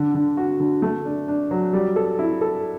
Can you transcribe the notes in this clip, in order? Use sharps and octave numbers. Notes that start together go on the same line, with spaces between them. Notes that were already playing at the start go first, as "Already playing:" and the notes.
Already playing: D3
D3
F#4
D3
A3
D4
D4
F#3
G3
A4
E4
A4